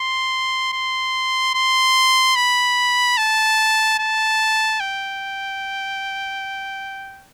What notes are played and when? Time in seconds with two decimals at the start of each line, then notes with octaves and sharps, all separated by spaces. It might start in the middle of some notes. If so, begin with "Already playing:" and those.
Already playing: C6
0.73 C6
1.54 C6
2.36 B5
3.17 A5
3.99 A5
4.80 G5